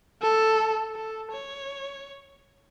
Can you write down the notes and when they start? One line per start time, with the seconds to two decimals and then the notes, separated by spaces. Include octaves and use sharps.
0.22 A4
0.95 A4
1.32 C#5